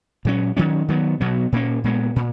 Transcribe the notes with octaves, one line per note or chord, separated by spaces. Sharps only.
A#2 F#3 C#4
D#3 F#3 C#4
D#3 F#3 B3
B2 F#3 B3
A#2 A#3 C#4
A#2 G#3 B3
A#2